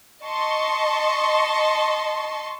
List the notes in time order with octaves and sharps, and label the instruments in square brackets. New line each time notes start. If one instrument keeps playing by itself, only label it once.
[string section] D#5 A5 C6 C#6